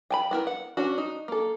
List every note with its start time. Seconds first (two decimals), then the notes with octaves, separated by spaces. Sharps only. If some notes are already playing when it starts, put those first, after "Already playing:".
0.10 G5 G#5 B5
0.31 B3 E4 A#4
0.47 F#5
0.77 C#4 D4 F#4
0.98 D#4
1.28 A#3 A4